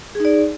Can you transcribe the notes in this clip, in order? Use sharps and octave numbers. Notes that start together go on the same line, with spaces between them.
D#4 G#4 D5